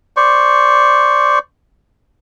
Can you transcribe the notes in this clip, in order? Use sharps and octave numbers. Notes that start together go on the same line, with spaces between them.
C5 D5 C#6